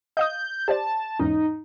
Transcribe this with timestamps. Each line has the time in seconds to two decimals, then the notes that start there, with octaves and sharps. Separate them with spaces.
0.17 D#5 F5 D#6 G6
0.30 G6
0.68 G4 C5 D5 A5
1.20 E2 G#2 C#4 D#4